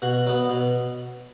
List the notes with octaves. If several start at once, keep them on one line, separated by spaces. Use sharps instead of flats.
B2 F#4
F#3 B3
B2